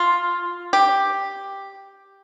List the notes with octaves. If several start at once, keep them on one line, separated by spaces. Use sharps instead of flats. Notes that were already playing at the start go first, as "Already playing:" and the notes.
Already playing: F4
G4